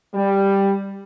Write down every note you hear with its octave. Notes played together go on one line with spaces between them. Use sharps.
G3